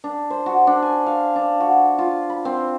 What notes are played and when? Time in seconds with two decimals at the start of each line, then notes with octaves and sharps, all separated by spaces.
0.04 D4
0.30 C5
0.46 F#4
0.67 D4
0.83 G#5
1.06 F5
1.36 D4
1.60 F#4
1.99 F4
2.29 B5
2.45 C4